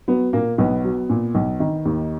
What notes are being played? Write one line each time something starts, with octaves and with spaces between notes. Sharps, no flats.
F#3 B3
A#2 A#3
B1 B3
F#3
A#2
B1
D#3
D#2